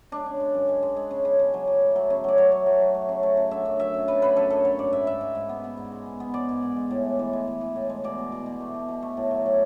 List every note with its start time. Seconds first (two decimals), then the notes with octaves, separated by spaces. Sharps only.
0.12 G#3 D4
0.26 C#3
0.40 G#3
0.54 F#2
0.69 G#3
0.83 G#3
0.97 G#3
1.11 C#3
1.25 C#3
1.39 C#3
1.54 F#3
1.67 F#3
1.81 A3
1.96 F#3
2.10 C#3
2.24 F#3 D5
2.38 F#3 C#5
2.52 A3
2.66 F#3
2.81 F#3
2.95 A3
3.09 C#3
3.23 A3
3.37 C#3
3.51 D3 E5
3.65 F#2
3.80 F#2 E5
3.94 F#2
4.08 F#2 B4
4.22 D3 B4
4.36 F#2 A4
4.50 F#2 A4
4.65 F#3 C#5
4.79 G#2 D5
4.93 G#2 E5
5.07 G#2 E5
5.21 G#2
5.35 G#2
5.49 B3
5.64 B3
5.77 G#2
5.92 G#3
6.06 B3
6.20 B3
6.34 G#3 D5
6.49 G#2
6.62 G#2
6.76 G#3
6.91 A2
7.05 A2
7.19 E3
7.33 G#3
7.47 E3
7.61 E3
7.76 A2
7.90 G#3
8.04 B2 D5
8.18 B2
8.32 B2
8.46 B2
8.60 A3
8.75 B2
8.89 B2
9.02 A3
9.17 A2
9.31 F#3
9.46 F#3